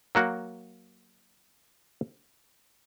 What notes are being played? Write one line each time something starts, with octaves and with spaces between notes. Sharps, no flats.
F#3 A#3 F#4